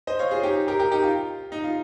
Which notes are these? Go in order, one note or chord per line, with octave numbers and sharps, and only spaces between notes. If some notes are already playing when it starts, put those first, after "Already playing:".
C5 D#5
C#5 F5
F4 G#4
D#4 G4
G4 A#4
G4 A#4
D#4 G4
F4
D#4
F4